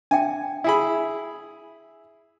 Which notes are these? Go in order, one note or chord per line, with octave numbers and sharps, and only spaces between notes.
D4 E5 G5 G#5
E4 G#4 B5